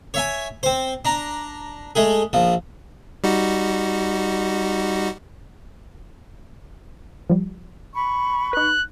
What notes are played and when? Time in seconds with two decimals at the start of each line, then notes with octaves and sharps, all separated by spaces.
0.14 C#5 E5 G#5
0.63 C4 C5
1.05 D4 A#5
1.95 G#3 A3 G#4
2.33 A#1 F3
3.24 G3 D#4 F#4
7.30 F3 G3
7.94 B5 C#6
8.53 D#4 B4 F#6